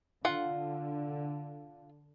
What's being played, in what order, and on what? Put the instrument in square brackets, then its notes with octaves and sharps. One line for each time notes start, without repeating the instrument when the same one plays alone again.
[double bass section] D3 [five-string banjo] F4 F#5